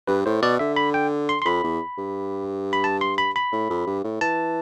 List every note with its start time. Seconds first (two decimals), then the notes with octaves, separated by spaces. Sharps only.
0.08 G2 B4
0.26 A2 C5
0.42 B2 D5
0.59 D3 E5
0.77 B5
0.94 G5
1.29 C6
1.42 C6
1.45 F2 B5
1.64 E2
1.98 G2
2.73 B5
2.84 A5
3.01 C6
3.18 B5
3.36 B5
3.52 A2
3.70 F2
3.87 G2
4.04 A2
4.21 E3 A5